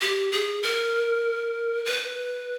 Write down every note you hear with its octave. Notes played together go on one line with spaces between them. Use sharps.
G4
G#4
A#4
B4